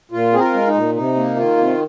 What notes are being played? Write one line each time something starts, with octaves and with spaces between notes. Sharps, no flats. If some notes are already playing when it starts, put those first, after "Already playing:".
A#2 F4
C4 G#4
F4 A#4
G#3
D#4
A#2
C3 D#4
A#3
D#3 F4
C3